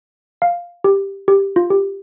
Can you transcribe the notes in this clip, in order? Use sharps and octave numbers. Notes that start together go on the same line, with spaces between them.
F5
G4
G4
F4
G4